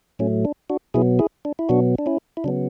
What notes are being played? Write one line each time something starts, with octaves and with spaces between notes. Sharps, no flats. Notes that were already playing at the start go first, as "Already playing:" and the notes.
A2 F#3 A3 C#4
D4
D4 F#4
B2 F#3 B3 E4 G#4
E4 G#4
D4
E4
B2 F#3 B3 D4 F#4
D4
C#4 E4
E4
C#3 F#3 B3 D4